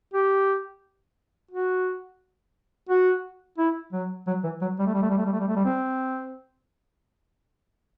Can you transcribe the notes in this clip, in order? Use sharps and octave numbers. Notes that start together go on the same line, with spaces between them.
G4
F#4
F#4
E4
F#3
F#3
E3
F#3
G3
A3
G3
A3
G3
A3
G3
A3
G3
A3
G3
C4